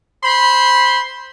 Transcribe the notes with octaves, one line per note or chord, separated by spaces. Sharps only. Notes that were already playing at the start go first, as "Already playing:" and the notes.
C5 B5 C6